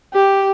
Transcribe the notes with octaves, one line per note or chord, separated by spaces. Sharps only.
G4